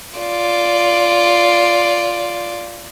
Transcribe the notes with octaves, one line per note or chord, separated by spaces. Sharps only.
F4 D5